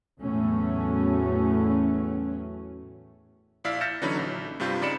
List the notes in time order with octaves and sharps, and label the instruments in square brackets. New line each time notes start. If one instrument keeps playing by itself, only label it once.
[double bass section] E2 A2 F#3 A3 C#4
[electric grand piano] A#1 E4 D5 F5 E6 B6
F6 G6 A6 A#6 C#7 E7
D3 E3 F#3 C#4 D#4 B5
A#1
G2 C3 G3 F4 G6
C#3 D#4 D5 B5 C#7 E7